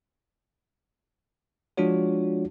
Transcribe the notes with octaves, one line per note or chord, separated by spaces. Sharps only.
F3 G#3 D4 F4 F#4 C#5